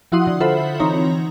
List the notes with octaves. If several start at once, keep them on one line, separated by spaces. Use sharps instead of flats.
F3 E4 F#4 F#5 C6 D#6
D3
F4 A4 C5 E5 F#5 B5
E3 C4 D#4 C#5 A#5